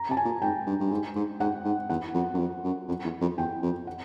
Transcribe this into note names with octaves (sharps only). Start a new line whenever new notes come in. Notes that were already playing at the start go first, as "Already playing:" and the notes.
Already playing: A#5
C3 A5
G#5
A#2
G#2 G5
G2
G2
G#2
G#2
G#2 F#5
G#2
E2 F#5
F2
F#2
F2
F#2
F2
E2
F2
E2 G5
F2
F#5